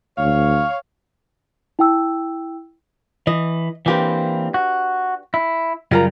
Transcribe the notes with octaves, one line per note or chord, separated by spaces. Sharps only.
D2 C#5 F5
E4 G5 E6
E3 D#5
E3 A#3 C4 D4 G4 B4
F#4
E4
F#2 C#3 G3 F4 A#4 A#5